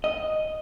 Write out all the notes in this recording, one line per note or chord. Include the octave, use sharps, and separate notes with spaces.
D#5